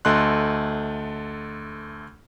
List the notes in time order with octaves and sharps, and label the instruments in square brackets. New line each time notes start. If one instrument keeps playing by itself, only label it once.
[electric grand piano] D2 A3 D#5 C6 F#6